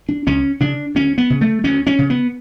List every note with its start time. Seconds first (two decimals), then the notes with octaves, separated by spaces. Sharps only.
0.09 D4
0.27 C#2 C#4
0.60 C#3 D4
0.95 D2 C#4
1.18 B3
1.30 C#3
1.41 A3
1.64 D2 C#4
1.87 C#4
1.99 C#3
2.10 B3